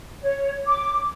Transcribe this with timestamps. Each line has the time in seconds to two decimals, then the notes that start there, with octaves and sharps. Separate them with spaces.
0.23 C#5
0.67 D6